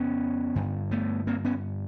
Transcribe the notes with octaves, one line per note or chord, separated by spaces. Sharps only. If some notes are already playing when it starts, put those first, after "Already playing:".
Already playing: F2 C#3 B3 C#4
G2 D3
A3 B3
A#3 C4
B3 C#4